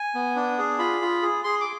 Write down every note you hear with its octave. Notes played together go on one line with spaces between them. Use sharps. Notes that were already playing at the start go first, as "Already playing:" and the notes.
Already playing: G#5
B3
D4
G#4
F4 B5
F4
G#4
G#4 C6
D6